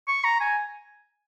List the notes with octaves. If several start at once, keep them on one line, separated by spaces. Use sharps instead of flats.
C#6
A#5
G#5